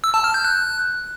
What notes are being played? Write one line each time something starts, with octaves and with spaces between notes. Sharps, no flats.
E6
A5
F6
G6
F#6